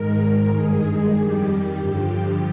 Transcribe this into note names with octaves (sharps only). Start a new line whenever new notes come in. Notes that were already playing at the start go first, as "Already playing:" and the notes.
Already playing: G#2 D#3 G#3 A#4
G2 D#3 G#3 G#4
F2 D#3 G3 G4
G2 D3 F3